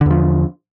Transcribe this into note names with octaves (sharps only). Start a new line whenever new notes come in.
E2 D3 F3